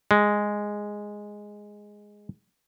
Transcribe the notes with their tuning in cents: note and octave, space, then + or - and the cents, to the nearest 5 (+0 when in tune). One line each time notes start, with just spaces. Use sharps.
G#3 -5